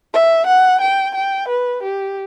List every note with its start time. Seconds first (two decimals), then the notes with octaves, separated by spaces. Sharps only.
0.14 E5
0.47 F#5
0.81 G5
1.15 G5
1.48 B4
1.83 G4